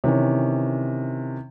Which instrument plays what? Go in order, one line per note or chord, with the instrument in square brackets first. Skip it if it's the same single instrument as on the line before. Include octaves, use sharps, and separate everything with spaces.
[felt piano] C3 D#3 E3 C#4